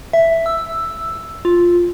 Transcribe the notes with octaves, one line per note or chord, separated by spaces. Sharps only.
E5
E6
F4